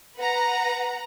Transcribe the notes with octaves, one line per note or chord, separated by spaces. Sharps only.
B4 F#5 A#5